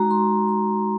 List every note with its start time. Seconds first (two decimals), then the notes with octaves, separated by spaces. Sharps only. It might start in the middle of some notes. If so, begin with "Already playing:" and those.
Already playing: G#3 D#4 F#4 A#5
0.11 C6
0.48 C6